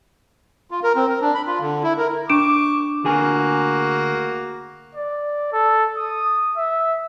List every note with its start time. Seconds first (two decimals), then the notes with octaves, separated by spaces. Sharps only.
0.71 F4
0.83 A#4
0.96 C4
1.09 A#4
1.21 D4
1.34 B5
1.47 F4
1.60 D3
1.83 E4
1.98 A#4
2.29 D4 C#6 D6 D7 E7
3.04 D2 A#3 F#4 G#4 G#5
4.95 D5
5.53 A4
5.97 D#6
6.57 E5